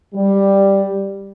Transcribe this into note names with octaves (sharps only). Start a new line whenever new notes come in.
G3